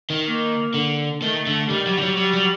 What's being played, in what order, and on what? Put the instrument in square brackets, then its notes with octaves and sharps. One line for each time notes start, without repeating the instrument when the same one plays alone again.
[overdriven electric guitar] D#3
[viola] A#3
[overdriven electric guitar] D3
[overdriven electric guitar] D#3 [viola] A3
[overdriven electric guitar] D3
[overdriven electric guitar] D#3 [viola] G3
[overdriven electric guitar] F#3
D#3
F#3
[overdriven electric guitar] F#3 [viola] G3
[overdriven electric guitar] F#3